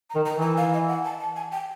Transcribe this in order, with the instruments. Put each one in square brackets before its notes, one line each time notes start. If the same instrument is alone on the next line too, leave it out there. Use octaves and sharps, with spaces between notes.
[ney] A#5
[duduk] D#3
[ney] A#5
[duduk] E3
[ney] A#5
F5
D#5
F#5
A5
A5
G#5
G5